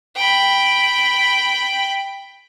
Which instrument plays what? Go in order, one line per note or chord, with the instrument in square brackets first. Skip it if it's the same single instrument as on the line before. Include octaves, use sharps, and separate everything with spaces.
[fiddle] G5 B5